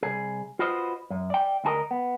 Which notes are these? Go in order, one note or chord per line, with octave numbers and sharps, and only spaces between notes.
C2 G#4
F4 F#4 B4 C5 D#5
F#2
D5 G5
D2 D#4 G#4 A#4 D#5
B3